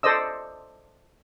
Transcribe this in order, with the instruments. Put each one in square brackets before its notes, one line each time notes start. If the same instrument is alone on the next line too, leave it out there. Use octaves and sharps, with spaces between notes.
[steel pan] A4 C5 D5 D#5 E6